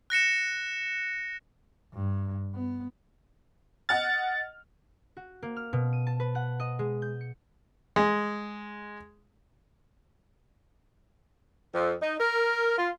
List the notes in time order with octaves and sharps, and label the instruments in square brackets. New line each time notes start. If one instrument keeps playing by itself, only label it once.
[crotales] F#6 A#6 C#7 E7
[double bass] G2
B3
[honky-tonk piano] D#5 F#5 F6 [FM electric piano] A6
[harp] F#4
A#3
F6
B2
D#7
A5
B4
F#5
D#5
G#3
G6
C#7
[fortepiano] G#3
[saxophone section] F2
D#4
A#4
F4